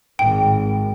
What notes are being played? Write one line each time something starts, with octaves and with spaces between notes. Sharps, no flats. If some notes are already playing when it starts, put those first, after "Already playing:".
G#1 G5